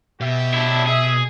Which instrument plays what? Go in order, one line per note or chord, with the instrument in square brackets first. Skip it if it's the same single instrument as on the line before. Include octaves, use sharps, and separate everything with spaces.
[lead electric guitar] B2 [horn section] G4 E5
[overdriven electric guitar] D4 E4
[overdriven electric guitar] G#4 [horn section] E5